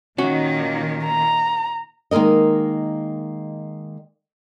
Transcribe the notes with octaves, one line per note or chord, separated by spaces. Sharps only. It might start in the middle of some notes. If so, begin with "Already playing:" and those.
A#2 D#3 A#3 C#4 F#4
A#5
D#3 G#3 A#3 A#4 D#5